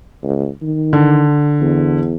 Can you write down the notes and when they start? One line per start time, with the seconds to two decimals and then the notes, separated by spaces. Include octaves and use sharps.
0.24 C#2
0.62 D#3
0.93 D3
1.61 E2